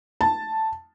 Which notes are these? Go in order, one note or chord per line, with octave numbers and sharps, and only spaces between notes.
A5